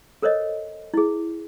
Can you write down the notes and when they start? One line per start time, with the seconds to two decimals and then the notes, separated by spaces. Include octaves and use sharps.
0.22 A4 A#4 C5 C#5 D#5
0.94 E4 G#4